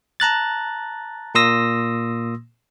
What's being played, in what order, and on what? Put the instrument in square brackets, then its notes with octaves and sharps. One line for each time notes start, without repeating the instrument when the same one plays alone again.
[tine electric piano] A5 A#5 F#6 A6
A#2 A#3 C6 D#6 E6 A#6